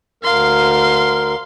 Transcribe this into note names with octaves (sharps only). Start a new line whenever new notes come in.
D2 A#4 F5 C6